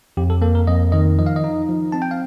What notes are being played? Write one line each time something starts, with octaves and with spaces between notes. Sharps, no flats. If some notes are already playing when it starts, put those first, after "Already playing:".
F2 G4
A4
A#3 A4
A#4
F2 D#5
D#3 D#5
F3 D#5
F5
D#5
D#4
F3
C4 A5
G5
F5